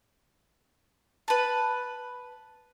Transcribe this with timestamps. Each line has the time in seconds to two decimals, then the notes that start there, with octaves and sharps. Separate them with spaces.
1.28 B4 A5